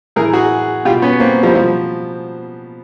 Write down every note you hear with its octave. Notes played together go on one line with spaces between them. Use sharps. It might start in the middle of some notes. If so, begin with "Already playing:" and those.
A2 E3 G#4 A#4
F#4 G#4
B2 F4 G4
B3 C#4
A#3 C4
F3 G3
B2 F3